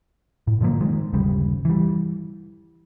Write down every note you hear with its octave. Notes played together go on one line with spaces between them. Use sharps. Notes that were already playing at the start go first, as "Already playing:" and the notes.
A2
A2 D3 F3 A#3
D#3 G#3
G1 D#2 C#3 G3
E3 G3